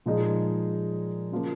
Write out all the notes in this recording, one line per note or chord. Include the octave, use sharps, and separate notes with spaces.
A#2 F3 G#3 D#4 G#4
C#3 F3 A#3